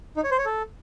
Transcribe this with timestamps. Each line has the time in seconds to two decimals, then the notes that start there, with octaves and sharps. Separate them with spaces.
0.17 D#4
0.24 C#5
0.31 C5
0.38 C#5
0.45 A4